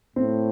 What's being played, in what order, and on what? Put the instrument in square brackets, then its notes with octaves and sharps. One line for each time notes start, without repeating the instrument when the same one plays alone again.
[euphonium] A2 [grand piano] C4